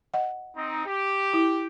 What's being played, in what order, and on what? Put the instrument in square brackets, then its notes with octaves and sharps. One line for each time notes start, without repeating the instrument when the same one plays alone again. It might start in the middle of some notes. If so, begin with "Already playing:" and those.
[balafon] D#5 F#5
[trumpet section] C4 D#4
G4
[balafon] E4